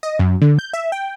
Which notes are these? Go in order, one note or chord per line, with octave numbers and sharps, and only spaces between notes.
D#5
F#2
D3
G6
E5
G5